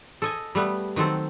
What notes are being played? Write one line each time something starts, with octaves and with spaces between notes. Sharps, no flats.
A4 D#5 G#5
G3 A3 B3
D#3 F#3 C4 A4